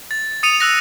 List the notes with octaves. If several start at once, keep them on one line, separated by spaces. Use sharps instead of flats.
A6
D#6 C#7 D#7 F7
E6 F#6 A#6